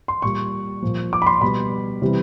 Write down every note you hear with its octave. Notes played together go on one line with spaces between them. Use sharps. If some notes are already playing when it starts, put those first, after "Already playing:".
C6
A#2 G3 C#6
A#2 F3
D6
B5
C6
B2 G3 B5
C3 E3 G3